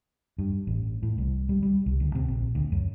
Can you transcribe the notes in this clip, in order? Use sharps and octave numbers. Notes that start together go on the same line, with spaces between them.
G2
A1
A2
C2
G3
G3
C2
D2
C3
A#1
D2
F#2